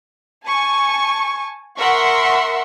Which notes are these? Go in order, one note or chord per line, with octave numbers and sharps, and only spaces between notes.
G#5 A5 C#6
A#4 E5 F#5 C6 C#6